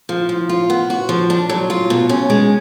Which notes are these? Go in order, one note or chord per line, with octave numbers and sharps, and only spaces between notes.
F3
F3
F4
B3
F#4
F3
D4
F#3
F4
B2
C#4
G#3